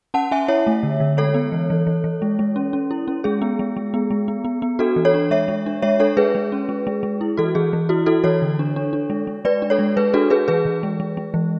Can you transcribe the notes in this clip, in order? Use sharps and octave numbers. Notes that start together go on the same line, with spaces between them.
C#4 F#5 A5
C#4 E5 G#5
E4 C#5 E5
A3
D3
D3
G#3 A4 C#5
B3
E3
E3
E3
E3
G#3
G#3
C#4
C#4
E4
C#4
G#3 G#4
B3
G#3
G#3
B3
G#3
B3
B3
B3
D4 F#4 A4
E3
A4 C#5
D4
G#3 C#5 E5
G#3
D4
G#3 C#5 E5
D4 A4 C#5
G#3 G#4 B4
G#3
C#4
G#3
G#3
G#3
E4
E3 F#4 A4
E3 G#4
E3
E4 F#4
E4 F#4 A4
E3 A4 C#5
D3
D4
D4
D4
G#3
G#3
G#3 B4 D5
D4
A4 C#5
G#3
G#3 G#4 B4
D4 F#4 A4
D4 G#4 B4
E3 G#4 B4
E3
G#3
G#3
G#3
E3